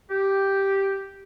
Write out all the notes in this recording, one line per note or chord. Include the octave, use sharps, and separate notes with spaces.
G4